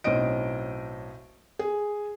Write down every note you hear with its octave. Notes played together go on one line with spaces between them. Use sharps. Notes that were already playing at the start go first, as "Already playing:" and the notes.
B1 A2 C4 C#4 D#5 D7
G#4